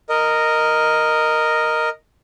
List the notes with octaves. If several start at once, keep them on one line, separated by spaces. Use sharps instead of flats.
A#4 D#5